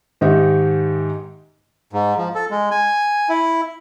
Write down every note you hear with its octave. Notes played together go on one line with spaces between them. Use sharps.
G#2 D#3 D#4 G4 E5
G#2
F3
A4
G#3
G#5
E4